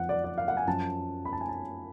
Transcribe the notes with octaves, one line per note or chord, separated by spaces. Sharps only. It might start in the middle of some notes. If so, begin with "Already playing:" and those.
Already playing: F2 F3 F#5
D5
D5
F5
F#5
G#5
F#2 F3 A5
B5
A5
G#5
A5